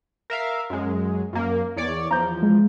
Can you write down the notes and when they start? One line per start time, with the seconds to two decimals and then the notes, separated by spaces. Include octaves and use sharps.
0.30 A#4 E5 F5
0.70 F#2 G#3
1.33 F#2 A#3
1.77 E2 C#5 D5
2.11 E2 F3 A#5 G6
2.42 G#3